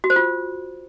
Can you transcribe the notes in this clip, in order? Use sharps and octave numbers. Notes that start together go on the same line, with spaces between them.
F#4
C5
F4